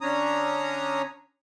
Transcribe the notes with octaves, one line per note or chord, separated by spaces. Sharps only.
D3 C#4 D4 C#5 A#5 D#6